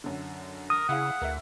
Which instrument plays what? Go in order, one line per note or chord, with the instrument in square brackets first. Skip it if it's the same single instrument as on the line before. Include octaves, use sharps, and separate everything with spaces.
[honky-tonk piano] F#2 D3
[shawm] A#4 [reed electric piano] D#6
[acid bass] C#3 [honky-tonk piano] E4 G#4 F5 [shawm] F#5
[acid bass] D2 [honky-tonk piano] A#4 E5